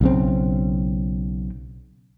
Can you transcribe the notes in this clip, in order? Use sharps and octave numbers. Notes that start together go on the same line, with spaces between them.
B1 C#3 C4